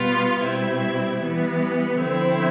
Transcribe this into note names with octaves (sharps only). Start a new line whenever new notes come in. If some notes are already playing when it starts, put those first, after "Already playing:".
Already playing: B2 G3 B3 F4
B2 G3 C4 E4
E3 G3 B3
D3 F3 C4 E4